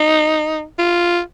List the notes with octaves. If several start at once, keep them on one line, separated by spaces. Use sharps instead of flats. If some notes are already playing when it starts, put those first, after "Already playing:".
Already playing: D#4
F4